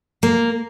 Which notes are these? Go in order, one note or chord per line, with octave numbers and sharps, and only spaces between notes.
A#3